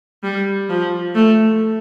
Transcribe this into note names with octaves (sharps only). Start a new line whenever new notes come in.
G3
F3
A3